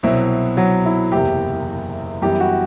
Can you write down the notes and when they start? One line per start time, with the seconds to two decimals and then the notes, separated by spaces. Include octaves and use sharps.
0.03 C2 B2 F#3 C4 E4
0.57 F#3
0.86 E4
1.12 F#1 E2 C3 G4
2.22 F#2 E3 G3 B3 G4
2.40 F#4